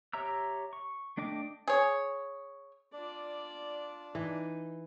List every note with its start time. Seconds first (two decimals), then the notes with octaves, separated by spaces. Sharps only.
0.13 G4 C#5 E5 A#5 E6
0.73 C#6
1.17 A3 D4 D#5 G5 D6
1.68 G#4 C#5
2.93 D4 F4 D5
4.15 E3 D#4